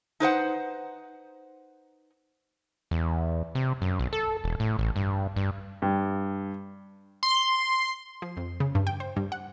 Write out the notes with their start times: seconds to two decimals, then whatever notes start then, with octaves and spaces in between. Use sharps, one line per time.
0.20 D#4 B4 C5 F#5
2.91 E2
3.55 C3
3.82 F#2
3.99 B1
4.13 A4
4.44 E1
4.60 A2
4.79 A1
4.96 G2
5.36 G2
5.82 G2
7.23 C6
8.22 F3
8.37 F2
8.60 C#3
8.75 G2
8.87 G5
9.00 C5
9.16 G2
9.32 F#5